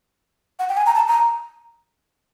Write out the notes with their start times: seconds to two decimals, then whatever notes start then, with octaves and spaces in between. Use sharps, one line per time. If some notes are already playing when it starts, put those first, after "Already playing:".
0.59 F#5
0.69 G5
0.77 G#5
0.86 A#5
0.95 A5
1.08 A#5